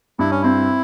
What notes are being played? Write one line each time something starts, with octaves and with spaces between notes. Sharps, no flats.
G2 E4
C#4
C4 E4